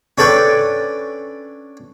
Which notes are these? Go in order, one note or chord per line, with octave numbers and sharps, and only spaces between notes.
C#4 D4 A4 B4 G5 C#6